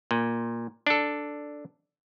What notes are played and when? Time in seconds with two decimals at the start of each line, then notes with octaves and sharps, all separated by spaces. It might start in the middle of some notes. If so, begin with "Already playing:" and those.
0.11 A#2
0.87 D4 A4